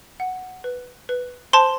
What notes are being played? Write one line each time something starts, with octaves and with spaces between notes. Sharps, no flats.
F#5
B4
B4
C5 A5 C6